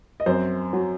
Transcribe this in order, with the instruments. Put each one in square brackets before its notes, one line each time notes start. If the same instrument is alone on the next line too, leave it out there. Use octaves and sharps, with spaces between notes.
[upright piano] D#5
F#2 C4 C5
F#3